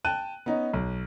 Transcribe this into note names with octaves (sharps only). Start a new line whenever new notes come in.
G5 A5 F#6 D#7
B3 C#4 D#4
B1